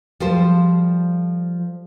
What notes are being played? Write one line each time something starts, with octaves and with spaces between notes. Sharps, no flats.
F3 G3 A4 C5